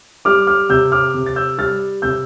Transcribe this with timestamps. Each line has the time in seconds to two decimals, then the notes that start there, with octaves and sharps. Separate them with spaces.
0.25 G3 D6 F6
0.47 D6 F6
0.69 C3 E6 G6
0.92 D6 F6
1.14 C3
1.26 A6
1.36 E6 G6
1.58 G3 F6 A6
2.02 C3 E6 G6